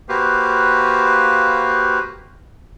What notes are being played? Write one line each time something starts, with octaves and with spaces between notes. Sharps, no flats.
A#3 F#4 G4 B4 C5 F5